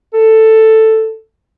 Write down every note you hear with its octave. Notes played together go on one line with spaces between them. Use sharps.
A4